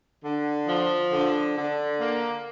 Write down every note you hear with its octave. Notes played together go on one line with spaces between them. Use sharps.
D3
F3
D3
D3
A#3